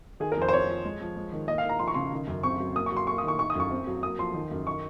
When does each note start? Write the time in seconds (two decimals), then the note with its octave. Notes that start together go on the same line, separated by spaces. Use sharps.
0.20 D#3 G#4
0.32 A#4
0.37 F2 C5
0.48 C5
0.52 C4 C#5
0.69 F3
0.85 G#3
1.01 F3
1.16 G#3
1.33 D#3
1.48 A#3 D#5
1.58 F5
1.63 D#3
1.69 A#5
1.79 F3 C6
1.88 C#6
1.94 C#3 C6
2.12 D#3
2.27 F#2
2.43 C4 C#6
2.60 F#3
2.75 A#3 D#6
2.86 C#6
2.92 F#3 C6
3.07 A#3 C#6
3.18 D#6
3.24 D#3 C#6
3.39 D#3 C#6
3.50 D#6
3.55 F#2 C#6
3.71 C4
3.87 F#3
4.03 A#3 D#6
4.18 F3 C6
4.34 D#3
4.51 F#2
4.66 D#3 C#6